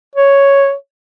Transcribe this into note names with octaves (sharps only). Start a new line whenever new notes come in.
C#5